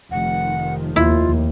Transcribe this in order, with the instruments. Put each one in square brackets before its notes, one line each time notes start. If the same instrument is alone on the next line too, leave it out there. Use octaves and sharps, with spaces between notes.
[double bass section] F1 D#3 F3 [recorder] F#5
[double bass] D#2 [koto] E4 [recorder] F4